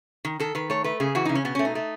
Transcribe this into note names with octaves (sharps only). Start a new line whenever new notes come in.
D#3
D#3 A4
D#3 B4
A3 C#5
A3 B4
C#3 G#4
E3 F#4
C#3 D#4
C#4
B2 B3
C#4
A3
D#4
A3